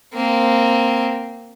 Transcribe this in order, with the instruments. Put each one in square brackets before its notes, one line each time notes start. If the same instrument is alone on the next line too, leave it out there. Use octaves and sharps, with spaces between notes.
[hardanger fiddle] A#3 C4